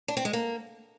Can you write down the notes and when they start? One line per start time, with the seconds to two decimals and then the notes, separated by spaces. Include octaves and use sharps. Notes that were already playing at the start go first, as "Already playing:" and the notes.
0.08 D4
0.17 C4
0.25 G#3
0.33 A#3